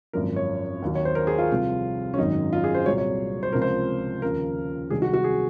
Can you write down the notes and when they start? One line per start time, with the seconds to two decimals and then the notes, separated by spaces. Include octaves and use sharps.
0.13 G#1 F#2 F3 A#4
0.36 C#5
0.82 D#2 D#3 F#3
0.95 C#5
1.05 C5
1.15 A#4
1.27 G#4
1.38 F4
1.50 C2 C3 F3
2.14 C#4
2.18 G#1 F#2 D#3 F#3 D#4
2.53 F4
2.64 G#4
2.75 C5
2.86 C2 A#2 F#3 C#5
2.98 C#5
3.43 C5
3.53 C#2 C3 F3 A#4
3.62 C5
4.22 D#2 C#3 F3 A#4
4.90 C2 C3 D#3 F#3 G#4
5.02 F#4
5.14 F#4
5.24 G#4